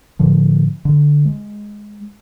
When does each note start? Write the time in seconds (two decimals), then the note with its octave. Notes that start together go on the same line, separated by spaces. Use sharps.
0.19 A2 D3 F3
0.85 D3
1.25 G#3